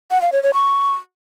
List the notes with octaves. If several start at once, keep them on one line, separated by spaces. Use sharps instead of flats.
F#5
F5
C#5
C#5
C#6